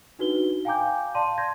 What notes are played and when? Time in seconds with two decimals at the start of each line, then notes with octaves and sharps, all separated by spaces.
0.19 D4 D#4 F#4 B4 G7
0.65 F5 G5 G#5 A#5 D6 G6
1.15 D5 F5 A5 C6 D#7
1.38 C6 G6 G#6 A#6